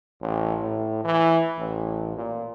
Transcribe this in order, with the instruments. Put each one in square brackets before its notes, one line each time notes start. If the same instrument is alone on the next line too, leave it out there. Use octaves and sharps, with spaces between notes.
[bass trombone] A1
A2
E3
A1
A#2